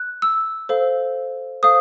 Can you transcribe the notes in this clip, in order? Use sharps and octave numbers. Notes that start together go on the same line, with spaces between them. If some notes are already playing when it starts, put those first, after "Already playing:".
Already playing: F#6
E6
A4 C5 F5
A4 C5 F5 D#6